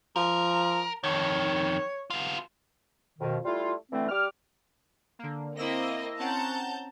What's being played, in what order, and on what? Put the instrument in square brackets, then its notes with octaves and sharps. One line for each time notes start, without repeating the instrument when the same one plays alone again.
[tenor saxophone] F3 [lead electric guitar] A#4
[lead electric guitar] F2 D#3 [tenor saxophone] C#5
[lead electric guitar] B3 F4
[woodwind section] F2 B2 D#3
G3 A3 E4 F4
D3 E3 A3 C4
G3 G4 D6 F6
[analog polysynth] D3 A#3
[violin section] A#3 C4 D#5 [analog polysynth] E4 E6 A#6
[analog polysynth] C4 C#4 F#5 [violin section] A5 A#5 G6